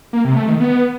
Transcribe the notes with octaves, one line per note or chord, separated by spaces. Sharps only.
A#3
C3
A3
D#3
B3